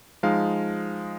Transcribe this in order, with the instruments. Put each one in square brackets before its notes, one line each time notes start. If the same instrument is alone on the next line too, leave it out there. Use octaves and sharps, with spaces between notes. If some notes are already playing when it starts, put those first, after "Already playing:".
[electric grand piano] F3 G#3 D#4 F5